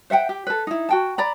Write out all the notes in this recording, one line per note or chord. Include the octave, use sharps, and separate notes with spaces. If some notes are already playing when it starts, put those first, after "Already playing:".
C5 E5 F#5 G5
G4
A4 B4
D#4 E4
F#4 G5 A5
D5 A#5 B5